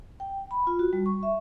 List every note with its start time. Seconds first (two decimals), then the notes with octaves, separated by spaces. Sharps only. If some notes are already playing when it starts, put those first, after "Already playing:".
0.20 G5
0.51 B5
0.67 F4
0.79 F#4
0.93 G3
1.06 C#6
1.23 E5